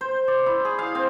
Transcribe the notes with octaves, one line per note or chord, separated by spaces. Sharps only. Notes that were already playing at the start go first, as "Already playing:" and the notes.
C5
D5
E4
G#4
F5
C4